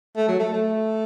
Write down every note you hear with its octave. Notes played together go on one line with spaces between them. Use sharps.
A3
F#3
A3
A3